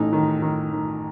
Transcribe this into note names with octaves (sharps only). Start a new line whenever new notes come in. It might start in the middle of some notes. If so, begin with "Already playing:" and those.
Already playing: A1 D#4
D#3
D#3
D#3